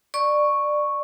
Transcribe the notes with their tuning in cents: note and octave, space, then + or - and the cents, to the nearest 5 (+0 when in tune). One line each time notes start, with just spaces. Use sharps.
D5 +20 C#6 +0